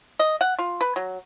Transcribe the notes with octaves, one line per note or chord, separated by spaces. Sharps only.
D#5
F#5
F4
B4
F#3